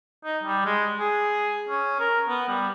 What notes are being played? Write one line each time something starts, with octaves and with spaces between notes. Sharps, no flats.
D#4
G3
G#3
G#4
C#4
A#4
B3
G3